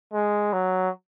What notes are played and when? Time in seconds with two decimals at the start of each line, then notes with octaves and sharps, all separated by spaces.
0.13 G#3
0.53 F#3